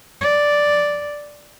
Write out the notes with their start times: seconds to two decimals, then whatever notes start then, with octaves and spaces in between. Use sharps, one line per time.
0.21 D5